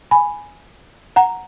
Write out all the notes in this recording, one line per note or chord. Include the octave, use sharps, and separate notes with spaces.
G#5 B5
F#5 A#5